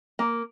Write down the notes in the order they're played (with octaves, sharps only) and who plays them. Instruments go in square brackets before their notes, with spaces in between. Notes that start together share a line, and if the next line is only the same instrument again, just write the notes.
[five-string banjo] A#3